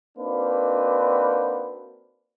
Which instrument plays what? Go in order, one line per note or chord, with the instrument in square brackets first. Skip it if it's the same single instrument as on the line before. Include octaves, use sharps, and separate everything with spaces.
[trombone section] A#3 C4 D4 D#4 F#4 B4